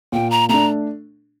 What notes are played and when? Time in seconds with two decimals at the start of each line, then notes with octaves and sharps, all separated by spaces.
0.12 A#2 G5
0.31 A#5
0.49 A3 D4 A#5